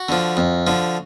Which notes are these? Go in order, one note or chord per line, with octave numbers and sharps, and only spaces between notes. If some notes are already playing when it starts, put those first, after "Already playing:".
Already playing: F#4
D3 F3
F2
D3 F3